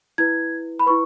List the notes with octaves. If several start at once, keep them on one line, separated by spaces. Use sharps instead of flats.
E4 B4 G#6
B5
E4 B4 C#6